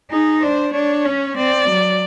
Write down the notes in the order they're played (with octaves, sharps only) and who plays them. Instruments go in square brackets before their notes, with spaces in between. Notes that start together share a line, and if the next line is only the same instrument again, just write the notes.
[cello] D#4 [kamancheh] G#4
[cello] D4 [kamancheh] C5
[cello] D4 [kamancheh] C#5
[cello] C#4
[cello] C4 [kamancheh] D5
[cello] F#3